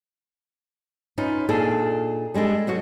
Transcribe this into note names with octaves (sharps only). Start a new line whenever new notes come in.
C#4 D#4 F4 B4
A#2 D4 D#4 G#4 A4
G3 G#3 D4 A4
B2 F#3 F#4